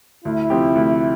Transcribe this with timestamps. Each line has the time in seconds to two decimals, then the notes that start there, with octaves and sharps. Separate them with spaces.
0.24 D2 E4
0.50 C3 F3 C4 G4
0.75 D2